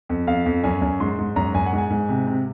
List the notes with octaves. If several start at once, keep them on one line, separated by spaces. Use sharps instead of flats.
F2
F2 F5
F2
F#2 G#5
F#2
G#2 C6
G#2
F#2 A#5
F#2 G#5
F#5
G#2
G#5
G#2
C3
C3